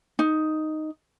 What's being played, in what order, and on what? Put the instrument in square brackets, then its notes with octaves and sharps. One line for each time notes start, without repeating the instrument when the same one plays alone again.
[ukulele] D#4